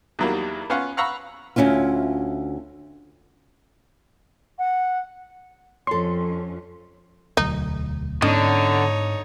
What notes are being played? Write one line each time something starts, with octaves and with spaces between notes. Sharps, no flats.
E2 D#3 F#3 G3 A#3
B3 C#4 F4 F5 F#5 C#6
F5 F#5 A#5 B5 C#6 E6
D2 G#2 C#4 E4 F4
F#5
F2 C#4 A4 C#5 C6
E1 D2 F#3 D#4
G#2 D3 G#3 B3 C#4 D#4 C#5 D#5